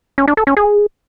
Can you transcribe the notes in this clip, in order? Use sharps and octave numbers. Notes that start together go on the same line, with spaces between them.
C#4
D4
A4
C#4
G#4